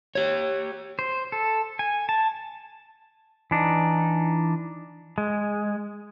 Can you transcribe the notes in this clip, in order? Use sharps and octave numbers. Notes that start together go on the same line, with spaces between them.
G4 C#5
C5
A4
G#5
A5
E3 D4 D#4
G#3